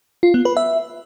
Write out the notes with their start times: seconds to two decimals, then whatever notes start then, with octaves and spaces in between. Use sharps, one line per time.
0.23 F4
0.34 B3
0.45 B4
0.57 E5